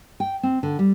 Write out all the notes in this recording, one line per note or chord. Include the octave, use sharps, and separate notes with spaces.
G5
C4
D3
G3